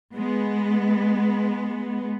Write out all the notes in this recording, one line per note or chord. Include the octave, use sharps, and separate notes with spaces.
G#3 B3